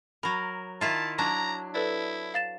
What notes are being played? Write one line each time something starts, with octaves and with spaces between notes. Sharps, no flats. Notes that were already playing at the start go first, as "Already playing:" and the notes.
F#3 A#4 B5
D#3 E4 F4 A5
F#3 D4 A#5
E4 A4 B4 D5
F5 A6 E7